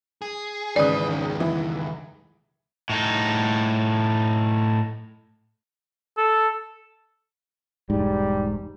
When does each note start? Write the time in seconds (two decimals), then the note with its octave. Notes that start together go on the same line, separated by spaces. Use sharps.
0.22 G#4
0.76 G#1 C#3 E3 B4 D5 D#6
1.07 C#2 D#3
1.40 E3
2.90 A2 D#4
6.17 A4
7.90 E1 G#2 G3